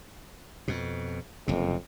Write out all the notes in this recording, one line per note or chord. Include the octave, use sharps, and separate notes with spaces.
F2 B2
F#1 F2 C3